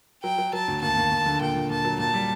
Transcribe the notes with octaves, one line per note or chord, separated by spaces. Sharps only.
F#3 G5
F#3
F#3 A5
D2
D#2 A5
D#2
D#2
D3
A#2 G5
A#2
A#2 A5
F#3
A#2 A5
G3